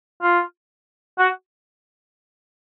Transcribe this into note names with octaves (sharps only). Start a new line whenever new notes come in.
F4
F#4